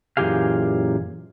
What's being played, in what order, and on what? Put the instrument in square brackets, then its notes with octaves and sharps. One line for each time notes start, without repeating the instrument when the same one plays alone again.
[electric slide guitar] F#2 A#2 E3 G4 G#4 F5